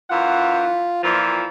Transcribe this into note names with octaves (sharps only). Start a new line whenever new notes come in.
F#2 E3 F4 F#5
A#2 E3 F3